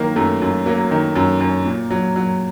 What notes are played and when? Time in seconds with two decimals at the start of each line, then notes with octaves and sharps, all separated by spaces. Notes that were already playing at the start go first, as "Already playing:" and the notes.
Already playing: D#3 F#3 A#3
0.16 F#2 A3
0.42 F#2
0.66 F#3 A#3
0.91 D#3
1.16 F#2
1.40 F#2
1.65 A#2
1.90 F#3
2.16 F#3